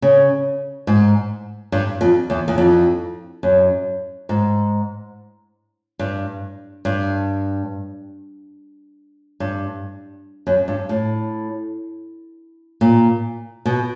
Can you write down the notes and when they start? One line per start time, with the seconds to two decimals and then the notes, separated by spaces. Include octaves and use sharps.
0.02 C#3
0.87 G#2
1.72 G2
2.01 F2
2.30 E2
2.48 E2
2.58 F2
3.43 F#2
4.29 G#2
5.99 G2
6.85 G2
9.40 G2
10.47 F#2
10.68 G2
10.89 A2
12.81 A#2
13.66 B2